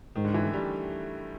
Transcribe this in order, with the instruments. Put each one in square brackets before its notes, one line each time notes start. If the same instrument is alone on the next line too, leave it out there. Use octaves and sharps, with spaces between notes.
[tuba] G#2 [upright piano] D#3
[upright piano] D3
E3
A3
G3